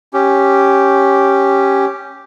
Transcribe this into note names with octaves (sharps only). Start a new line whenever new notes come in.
C#4 G4